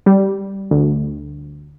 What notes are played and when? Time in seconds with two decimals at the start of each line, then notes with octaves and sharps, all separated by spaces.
0.06 G3
0.71 D2